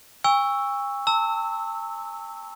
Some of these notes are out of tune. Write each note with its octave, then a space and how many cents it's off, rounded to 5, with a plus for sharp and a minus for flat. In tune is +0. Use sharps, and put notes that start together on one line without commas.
G#5 -45 C#6 +0 E6 +0
A5 +40 E6 -20